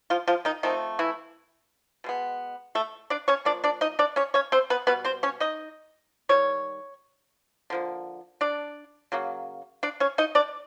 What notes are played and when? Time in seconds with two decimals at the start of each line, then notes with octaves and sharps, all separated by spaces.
0.10 F3 F4
0.27 F3 F4
0.45 D#3 D#4
0.63 D#3 F3 A3 C4 D#4
0.99 E3 E4
2.04 B2 G#3 B3
2.75 A3 A4
3.10 D4 D5
3.28 C#4 C#5
3.45 F3 A#3 D4 D5
3.64 D4 D5
3.81 D#4 D#5
3.99 D4 D5
4.16 C#4 C#5
4.34 C#4 C#5
4.52 C4 C5
4.70 B3 B4
4.87 B2 G3 B3 B4
5.04 C4 C5
5.23 C#4 C#5
5.40 D#4 D#5
6.29 D#3 G3 C#5
7.70 D3 F3 A#3
8.41 D4 D5
9.12 C#3 F#3 A#3
9.83 D4 D5
10.00 C#4 C#5
10.18 D#4 D#5
10.35 D4 D5